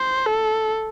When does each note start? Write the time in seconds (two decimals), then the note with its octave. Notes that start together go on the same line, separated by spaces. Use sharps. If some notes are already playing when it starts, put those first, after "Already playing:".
Already playing: C5
0.26 A4